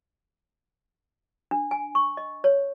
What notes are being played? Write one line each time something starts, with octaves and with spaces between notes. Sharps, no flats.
D4
G#5
C#6
D#5
C#5